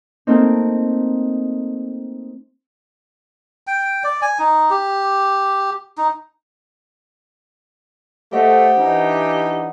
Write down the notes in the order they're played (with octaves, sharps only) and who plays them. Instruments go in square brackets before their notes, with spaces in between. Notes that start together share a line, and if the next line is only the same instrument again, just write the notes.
[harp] A3 A#3 C4 D#4
[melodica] G5
D5
G#5
D#4
G4
D#4
[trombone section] A3 [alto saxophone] G4 [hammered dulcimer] C5 D#5 F#5
[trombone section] E3 D4 D#4